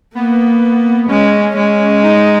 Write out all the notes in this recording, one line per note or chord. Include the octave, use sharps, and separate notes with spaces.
A#3 B3
G#3 C#4
G#3
D#4